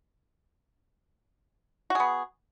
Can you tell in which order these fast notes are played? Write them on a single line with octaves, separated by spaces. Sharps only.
F#4 G#4 B3